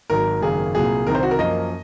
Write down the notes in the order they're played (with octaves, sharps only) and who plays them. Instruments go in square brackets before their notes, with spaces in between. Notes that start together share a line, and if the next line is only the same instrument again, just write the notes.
[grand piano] G#1 G#2 F#3 A#4
G#1 F#2 C#3 F#3 A#3 G#4
C2 A#2 F#3 G#4
C2 C3 D#3 A#4
C5
F#4
A#4
F#2 F3 A#3 D#5